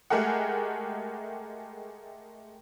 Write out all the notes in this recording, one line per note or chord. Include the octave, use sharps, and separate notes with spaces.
G#3 A3 G4 G#4 A#4 F#5